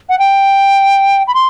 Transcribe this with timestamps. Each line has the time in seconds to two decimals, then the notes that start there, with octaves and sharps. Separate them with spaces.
0.09 F#5
0.19 G5
1.27 B5
1.34 C6